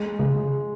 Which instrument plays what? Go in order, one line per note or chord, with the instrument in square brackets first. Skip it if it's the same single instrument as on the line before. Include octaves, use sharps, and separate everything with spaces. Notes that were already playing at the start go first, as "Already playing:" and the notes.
Already playing: [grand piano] G#3
[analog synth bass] C#3 [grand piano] G#3